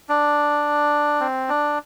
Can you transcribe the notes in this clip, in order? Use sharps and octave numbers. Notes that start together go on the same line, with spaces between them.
D4
C4
D4